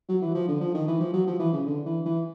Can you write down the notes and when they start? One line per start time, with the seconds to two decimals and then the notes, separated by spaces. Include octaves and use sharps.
0.09 F#3
0.22 E3
0.34 F3
0.48 D3
0.61 F3
0.74 D#3
0.87 E3
1.00 F3
1.13 F#3
1.27 F3
1.39 E3
1.53 C#3
1.66 D3
1.85 E3
2.06 E3